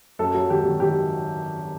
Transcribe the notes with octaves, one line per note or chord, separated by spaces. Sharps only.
F#2 A4
F#3
G#1 G4
G#1
D#3 G4